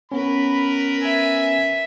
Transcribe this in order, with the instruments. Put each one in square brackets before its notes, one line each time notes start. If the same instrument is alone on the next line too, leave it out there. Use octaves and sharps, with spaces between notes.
[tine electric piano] B3 C#4 [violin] A#4 B4 [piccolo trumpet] B5
[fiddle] E5 [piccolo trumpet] G#5